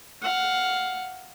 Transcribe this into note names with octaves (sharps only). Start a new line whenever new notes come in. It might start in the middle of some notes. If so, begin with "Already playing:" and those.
F5 F#5